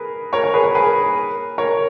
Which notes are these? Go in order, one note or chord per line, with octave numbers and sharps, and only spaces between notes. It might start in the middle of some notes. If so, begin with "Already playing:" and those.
Already playing: G#4 A#4 B4
A#4 C#5
A#4 C#5
G#4 B4
A#4
G#4 B4
A#4 C#5